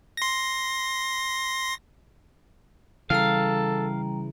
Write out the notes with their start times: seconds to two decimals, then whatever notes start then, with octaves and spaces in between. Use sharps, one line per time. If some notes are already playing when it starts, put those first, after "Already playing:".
0.17 C6 A#6
3.10 C#3 E3 G3 A4 F5 A#5